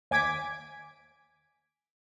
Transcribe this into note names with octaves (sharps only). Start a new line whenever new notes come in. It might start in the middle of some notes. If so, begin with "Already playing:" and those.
D#2 G#5 D6 G#6 B6 D7